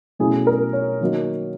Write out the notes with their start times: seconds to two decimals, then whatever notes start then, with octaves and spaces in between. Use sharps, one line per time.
0.19 B2 F#3 A3 C#4 E4 G#4
0.47 A#4
0.73 C#5
1.01 D#3 F#3 A#3 D#4